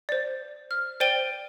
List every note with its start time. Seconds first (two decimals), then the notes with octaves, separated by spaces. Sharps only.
0.09 C5 D5
0.71 F6
1.00 C5 D5 G5 D#7 G7